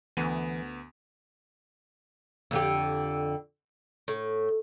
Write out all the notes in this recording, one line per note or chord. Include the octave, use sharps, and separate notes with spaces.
D2 E3 B3 D#7
F2 D3 G4
A2